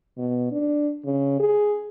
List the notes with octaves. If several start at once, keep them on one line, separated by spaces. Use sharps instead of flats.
B2
D4
C#3
G#4